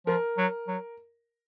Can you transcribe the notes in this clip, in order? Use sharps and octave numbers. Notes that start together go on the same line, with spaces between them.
F3 A#4
F#3
F#3